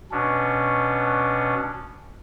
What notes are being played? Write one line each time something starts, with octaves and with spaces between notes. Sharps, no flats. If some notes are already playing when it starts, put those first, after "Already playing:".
B2 C#4 D4